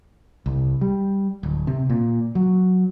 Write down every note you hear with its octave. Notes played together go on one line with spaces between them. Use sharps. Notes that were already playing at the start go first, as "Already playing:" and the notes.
C2
G3
D1
C3
A#2
F#3